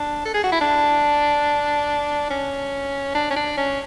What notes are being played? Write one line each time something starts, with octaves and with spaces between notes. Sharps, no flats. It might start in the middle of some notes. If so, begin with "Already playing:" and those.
Already playing: D4
A4
G#4
F#4
E4
D4
C#4
D4
C#4
D4
C#4